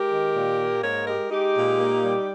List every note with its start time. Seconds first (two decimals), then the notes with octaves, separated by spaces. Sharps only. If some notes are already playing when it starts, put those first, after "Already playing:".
Already playing: G#3 G4 A#4
0.11 D#3
0.34 A#2
0.58 A#3
0.82 G#2 A#4 C#5
1.06 G#3 G4 A#4
1.30 G#3 D#4 G4
1.55 A#2
1.79 A#3
2.03 G3